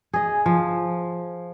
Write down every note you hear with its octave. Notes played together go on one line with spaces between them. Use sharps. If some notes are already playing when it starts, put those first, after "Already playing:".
G#4 D#5
F3